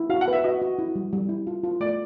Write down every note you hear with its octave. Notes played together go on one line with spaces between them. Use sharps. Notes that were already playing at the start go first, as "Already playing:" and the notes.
Already playing: E4
F#4 F5
F#5
B4
E5
F#4 D#5
F#4
E4
G3
G3
E4
F4
F4
A3 D5